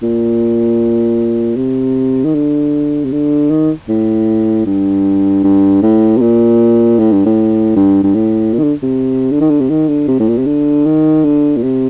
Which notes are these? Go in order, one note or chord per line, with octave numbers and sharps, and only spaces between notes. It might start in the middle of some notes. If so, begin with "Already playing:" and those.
A#2
C3
D#3
D3
C3
D3
D#3
A2
G2
G2
A2
C3
A#2
A2
G2
A2
G2
G2
A2
A#2
D#3
D3
C3
D3
D#3
D3
C3
D#3
D3
C3
A2
A#2
C3
D3
D#3
D3
A#2
C3